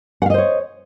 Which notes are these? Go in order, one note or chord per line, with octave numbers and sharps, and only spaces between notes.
C5 C#5 D#5 F5 F#5